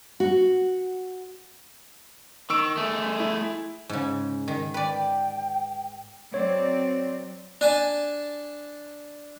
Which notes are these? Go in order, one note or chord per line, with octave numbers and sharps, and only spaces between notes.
F#4
D#3 C#6 E6 D7
A3 G#4
E4
G#2 C#3
D#3
B4 D5 G5
F#3 C4 C#5 D5
D4 G#5 A5